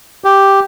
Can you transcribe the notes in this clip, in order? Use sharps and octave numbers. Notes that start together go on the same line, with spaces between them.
G4